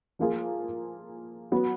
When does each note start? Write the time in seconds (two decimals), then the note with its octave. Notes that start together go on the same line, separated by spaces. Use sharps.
0.19 F3 A#3 F4 G#4
1.51 F#3 B3 F#4